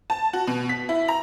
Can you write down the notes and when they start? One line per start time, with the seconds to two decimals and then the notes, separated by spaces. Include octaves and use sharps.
0.10 A5
0.33 F#4
0.47 B2
0.69 B6
0.89 E4
1.08 A#5